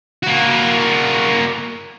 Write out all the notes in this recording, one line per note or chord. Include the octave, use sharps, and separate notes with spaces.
A#3 F#4